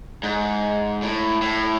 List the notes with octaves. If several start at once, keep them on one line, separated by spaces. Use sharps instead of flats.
G#2
A2
A2